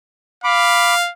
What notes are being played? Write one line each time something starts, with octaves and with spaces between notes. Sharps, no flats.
F5 B5 D6